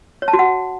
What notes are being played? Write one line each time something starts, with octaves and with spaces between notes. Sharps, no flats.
C#5
A5
F#4
F#5